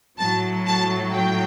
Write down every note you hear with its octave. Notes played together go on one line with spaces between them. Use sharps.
A2 F#3 A5
A5
G5